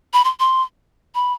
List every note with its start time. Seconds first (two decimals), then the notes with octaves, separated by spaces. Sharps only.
0.13 B5
0.24 C6
0.40 C6
1.15 B5